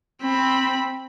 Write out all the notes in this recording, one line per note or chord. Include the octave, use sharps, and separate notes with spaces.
C4 B5